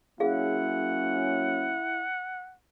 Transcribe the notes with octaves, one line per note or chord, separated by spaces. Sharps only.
F#3 A#3 C#4 E4 G#4 F5 F#5